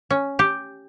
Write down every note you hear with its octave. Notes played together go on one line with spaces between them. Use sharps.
C#4
G4